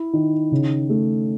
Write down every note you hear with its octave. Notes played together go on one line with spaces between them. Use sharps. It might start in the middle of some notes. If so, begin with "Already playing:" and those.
Already playing: E4
D#3
C#3
A3